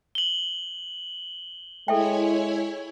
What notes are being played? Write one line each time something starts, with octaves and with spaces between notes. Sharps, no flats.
F#7 G7
G#3 E4 A4 C#5 E5 G5 G#5